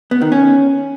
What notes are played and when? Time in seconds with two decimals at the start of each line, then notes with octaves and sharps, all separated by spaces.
0.11 B3
0.22 D#3
0.32 C#4